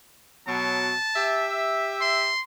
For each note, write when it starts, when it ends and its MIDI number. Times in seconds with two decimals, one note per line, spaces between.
0.48 0.94 47
0.48 0.94 54
0.48 1.51 81
1.16 2.32 67
1.16 2.32 76
2.01 2.41 84